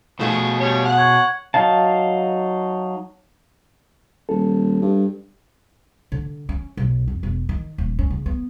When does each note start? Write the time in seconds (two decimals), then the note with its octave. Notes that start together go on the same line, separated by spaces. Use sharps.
0.20 B2 F3 A3 G#4
0.60 G3 C#5
0.85 F#5
0.98 C#5 F#6
1.54 F#3 D#4 F5 A5
4.29 D#1 A4
4.82 G2
6.12 D3
6.49 C#4
6.77 B1
7.08 F2
7.23 E1
7.49 D#3
7.78 D#1
7.99 C#4
8.10 C#3
8.26 B3